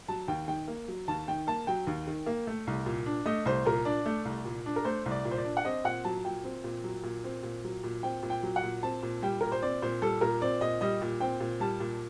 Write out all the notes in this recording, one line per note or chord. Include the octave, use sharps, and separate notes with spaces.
F#3 A5
D#2 G5
D#3 G5
A#3
F#3
D#2 A5
D#3 G5
A#3 A5
F#3 G5
D#2
D#3
A#3
A3
C2
A#2
D4
A3 D#5
C2 C5
A#2 A#4
D4 D5
A3
C2
A#2
D4
A#4
A3 C5
C2
D5
A#2
C5
D5
D4
F#5
C4 D#5
A#2 F#5
F#3 A5
A#2 G5
C4
A#2
F#3
A#2
C4
A#2
F#3
A#2
C4 G5
A#2
G5
F#3
F#5
A#2
C4 A5
A#2
G3 G5
A#2 A#4
C5
C4 D5
A#2 C5
G3 A4
A#2 A#4
C4 D5
A#2 D#5
G3 D#5
A#2
C4 G5
A#2
G3 A5
A#2